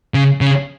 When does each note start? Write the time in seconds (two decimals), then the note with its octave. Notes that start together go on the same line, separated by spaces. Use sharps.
0.14 C#3
0.41 C#3